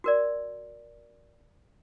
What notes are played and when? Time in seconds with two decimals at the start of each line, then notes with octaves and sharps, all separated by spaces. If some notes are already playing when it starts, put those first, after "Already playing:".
0.04 F#4 A#4 D5